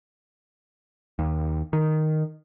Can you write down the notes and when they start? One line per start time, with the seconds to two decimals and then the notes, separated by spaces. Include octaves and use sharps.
1.19 D#2
1.73 D#3